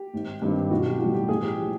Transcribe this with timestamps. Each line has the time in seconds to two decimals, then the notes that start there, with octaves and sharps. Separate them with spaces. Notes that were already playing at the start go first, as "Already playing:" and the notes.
Already playing: G4
0.14 G#1
0.42 G2 D#3 G3 C4
0.71 B1 F#4
0.86 G4
0.99 A2 E3 G3 F#4
1.14 G4
1.28 A1 G#4
1.43 G4
1.59 F3